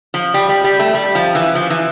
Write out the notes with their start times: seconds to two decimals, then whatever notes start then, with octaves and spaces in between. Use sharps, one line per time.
0.14 F3
0.34 G3
0.49 G3
0.64 G3
0.79 A3
0.94 G3
1.15 F3
1.35 E3
1.55 F3
1.70 E3